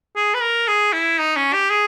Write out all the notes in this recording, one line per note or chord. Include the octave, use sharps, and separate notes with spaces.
G#4
B4
A#4
G#4
E4
D#4
C#4
G4
G#4